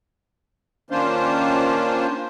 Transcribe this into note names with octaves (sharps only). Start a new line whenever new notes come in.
D#3 A#3 C#4 D4 F4 C5